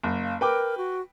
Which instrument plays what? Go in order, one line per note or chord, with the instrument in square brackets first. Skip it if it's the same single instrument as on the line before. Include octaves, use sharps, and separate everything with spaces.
[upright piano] F#1
[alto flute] F5
[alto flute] A#4 [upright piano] B4 G5 D6
[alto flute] F#4